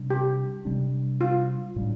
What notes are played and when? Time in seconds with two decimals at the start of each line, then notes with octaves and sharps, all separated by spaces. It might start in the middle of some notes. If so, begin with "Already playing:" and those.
Already playing: C3 G3 D4
0.10 G4
0.65 C3 G3 D4
1.21 F4
1.76 A2 G3 D4